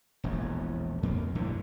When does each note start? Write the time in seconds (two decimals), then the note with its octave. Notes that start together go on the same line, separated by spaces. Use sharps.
0.24 E1 A#1 E2
1.03 F2 A#3
1.35 A#1 G2 D3 E3